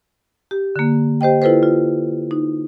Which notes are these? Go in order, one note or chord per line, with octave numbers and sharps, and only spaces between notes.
G4
D3 A#3
G4 C5 D#5 G5
E4 F4 A4 B4 C5
F4
D#4